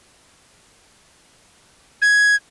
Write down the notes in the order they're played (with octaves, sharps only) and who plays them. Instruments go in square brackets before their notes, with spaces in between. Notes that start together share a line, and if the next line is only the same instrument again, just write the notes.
[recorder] G#6